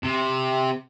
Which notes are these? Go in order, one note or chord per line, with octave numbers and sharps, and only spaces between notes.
C3